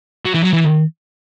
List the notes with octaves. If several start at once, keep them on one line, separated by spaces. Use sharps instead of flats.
F#3
E3
F#3
E3